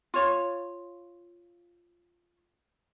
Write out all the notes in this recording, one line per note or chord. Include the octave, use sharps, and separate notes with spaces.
F4 C#5